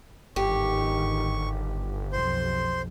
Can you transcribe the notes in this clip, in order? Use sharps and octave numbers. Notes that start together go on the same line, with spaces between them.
G1 G#2 D#3 G4 C#6
B1 F2 C5 C6